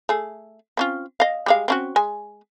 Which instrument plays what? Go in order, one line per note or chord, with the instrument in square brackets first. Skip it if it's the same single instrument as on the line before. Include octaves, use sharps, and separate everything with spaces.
[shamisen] A3 G#4
C4 C#4 F4
D#5 F5
G3 G#3 F5
C4 C#4 F#4
G#3 G#5